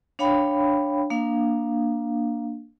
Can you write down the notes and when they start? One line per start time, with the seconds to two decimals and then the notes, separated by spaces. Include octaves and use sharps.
0.19 D4 C#5 F5 G5 B5
1.10 A#3 D4 F5